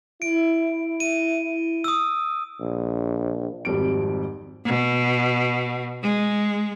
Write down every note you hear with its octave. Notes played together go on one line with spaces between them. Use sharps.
E4 D7
D#7
D#6 E6
A#1
G#1 F2 G3 D7
B2
G#3